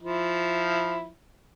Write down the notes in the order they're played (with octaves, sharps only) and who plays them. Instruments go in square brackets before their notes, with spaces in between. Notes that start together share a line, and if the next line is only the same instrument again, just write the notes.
[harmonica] F3 E4